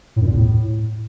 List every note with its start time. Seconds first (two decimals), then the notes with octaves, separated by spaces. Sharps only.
0.16 A2
0.21 F#2
0.26 A#2
0.31 E2
0.36 A2